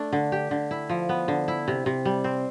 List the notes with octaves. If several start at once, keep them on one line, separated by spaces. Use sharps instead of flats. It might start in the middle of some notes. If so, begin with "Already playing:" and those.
Already playing: A3 D4
D3
G4
D3
E4
F3
B3
D3
E4
C3
C3
G3
C4